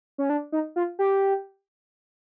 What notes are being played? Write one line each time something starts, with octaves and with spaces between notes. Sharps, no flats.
C#4
D4
D#4
F4
G4